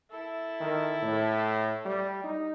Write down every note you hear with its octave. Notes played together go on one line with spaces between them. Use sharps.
E4 A4
D#3
A2
G3
D#4